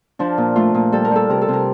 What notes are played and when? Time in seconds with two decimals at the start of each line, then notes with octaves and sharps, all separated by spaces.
0.19 F3 D4
0.38 A#2
0.56 A3 F4
0.74 A#2
0.92 G3 A4
1.04 A#4
1.11 G3 A4
1.29 C3 A#4
1.42 A4
1.48 C3 A#4